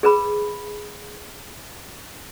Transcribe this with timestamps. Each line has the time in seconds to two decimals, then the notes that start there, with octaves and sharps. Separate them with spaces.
0.03 G#4 B4 B5